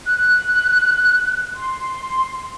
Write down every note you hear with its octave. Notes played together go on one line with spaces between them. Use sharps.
F#6
C6